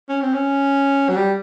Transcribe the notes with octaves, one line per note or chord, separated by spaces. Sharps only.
C#4
C4
C#4
F#3
G3